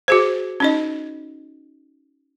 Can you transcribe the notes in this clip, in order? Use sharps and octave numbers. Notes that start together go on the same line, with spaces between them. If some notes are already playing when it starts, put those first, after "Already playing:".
F#4 G#4 C5
C#4 D#4 D#5